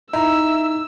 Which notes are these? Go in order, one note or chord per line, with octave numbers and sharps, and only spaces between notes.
D#4 E4 A#5 E6